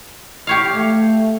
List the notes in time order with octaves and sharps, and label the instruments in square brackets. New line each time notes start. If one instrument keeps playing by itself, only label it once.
[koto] G4 C#5 F5
[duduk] A3